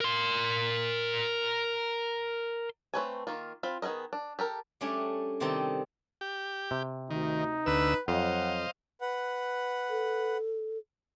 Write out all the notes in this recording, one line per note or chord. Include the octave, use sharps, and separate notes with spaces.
A#4 C6
A3 C4 B4 C#5 G#5
D#3 A#3 F4
C4 F4 B5
D#3 B3 G#4 A#4 D#5
D4
G4 A4 A#4
G3 A3 C#4 D4 C#5
C3 D#3 G3 C4 D#4 A4
G4
C3
D2 D#3 D#4
D2 B4 E6
F2 F#3 C5 D#5 F5 F#5
B4 F#5
A4